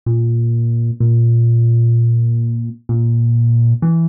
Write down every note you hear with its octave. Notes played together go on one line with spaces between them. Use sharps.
A#2
A#2
A#2
E3